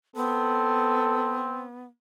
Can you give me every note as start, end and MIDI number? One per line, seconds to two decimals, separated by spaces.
0.16 1.84 59
0.16 1.64 60
0.16 1.49 69